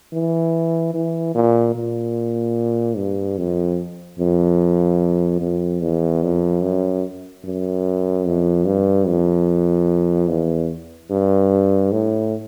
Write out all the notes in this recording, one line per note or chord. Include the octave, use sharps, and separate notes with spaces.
E3
E3
A#2
A#2
G2
F2
F2
F2
E2
F2
F#2
F#2
F2
G2
F2
E2
G2
A2